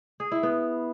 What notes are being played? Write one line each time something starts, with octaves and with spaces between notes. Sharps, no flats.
G#4
E4
B3